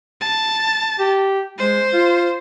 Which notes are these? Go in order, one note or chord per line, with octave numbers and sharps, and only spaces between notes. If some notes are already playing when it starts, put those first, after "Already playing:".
A5
G4
G#3 C5
F4